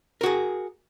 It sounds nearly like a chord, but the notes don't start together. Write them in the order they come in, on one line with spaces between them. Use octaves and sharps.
A#4 F#4 G#4